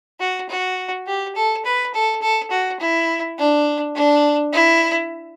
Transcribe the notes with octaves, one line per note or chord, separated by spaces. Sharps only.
F#4
F#4
G4
A4
B4
A4
A4
F#4
E4
D4
D4
E4